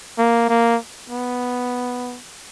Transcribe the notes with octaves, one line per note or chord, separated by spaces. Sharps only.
A#3
A#3
B3